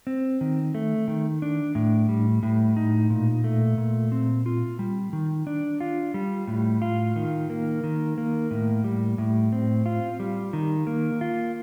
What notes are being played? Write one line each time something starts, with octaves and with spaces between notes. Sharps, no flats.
C4
D#3
A3
D#3
D4
A2
G3
A2
D#4
A#2
A3
A#2
C4
F4
G3
D#3
D4
F4
G3
A2
F4
D#3
A#3
D#3
A#3
A2
G3
A2
C4
F4
G3
D#3
A#3
F4